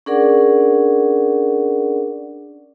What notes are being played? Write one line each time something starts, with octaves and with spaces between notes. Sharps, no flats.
C#4 D4 G#4 A#4 D5 F#5